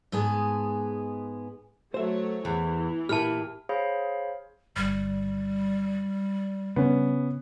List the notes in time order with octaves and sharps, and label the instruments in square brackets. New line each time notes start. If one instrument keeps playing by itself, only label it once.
[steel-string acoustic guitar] G#2 G#3 B3 G#4 A5
[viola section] F#3 A3 C#5 [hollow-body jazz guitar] C5 E5
[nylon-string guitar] E2 [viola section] E3
[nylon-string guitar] A#2 E4 [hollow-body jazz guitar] G4 [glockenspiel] A5 F6
[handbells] G#4 C5 C#5 F5 B5
[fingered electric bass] G1 [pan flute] G3
[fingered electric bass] C#3 D4 [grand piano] B3 C#4